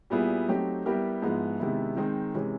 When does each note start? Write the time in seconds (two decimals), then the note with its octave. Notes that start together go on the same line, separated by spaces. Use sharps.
0.10 A#2 G3 B3 E4 G#4
0.48 F#3 A3 C4 D#4 G4
0.86 G3 B3 E4 G4 A#4
1.22 G#2 F3 G#3 B3 E4
1.60 C3 D#3 G#3 B3 E4
1.97 D#3 G#3 C4 D#4
2.35 C3 E3 G#3 C#4